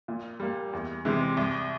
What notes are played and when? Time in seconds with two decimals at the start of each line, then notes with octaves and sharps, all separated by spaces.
0.08 A#2
0.40 G3 A#3
0.73 E2
1.05 C3 E3 G#3
1.37 C2